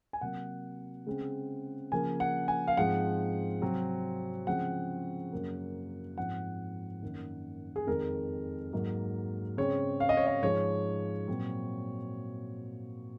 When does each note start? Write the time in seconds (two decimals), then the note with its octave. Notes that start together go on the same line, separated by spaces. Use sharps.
0.13 G#5
0.21 C3 F#3 A#3 F#5
1.06 C#3 G#3 C4
1.92 C#3 F3 A#3 G#5
2.20 F#5
2.48 G#5
2.68 F5
2.77 G#2 F3 G#3 C4 F#5
3.62 C3 F#3 C4
4.47 C#3 F3 G#3 C4 F#5
5.32 F#2 C#3 F#3 A#3
6.17 G#2 F3 C4 F#5
7.03 F#2 D#3 A#3
7.76 G#4
7.87 F2 D#3 G#3 A#4
8.72 G#2 F#3 A#3
9.57 C#3 G#3 C4 C#5
10.00 F5
10.09 D#5
10.17 C#5
10.27 D#5
10.42 G#2 F3 G#3 C#5
11.28 A#2 F#3 C4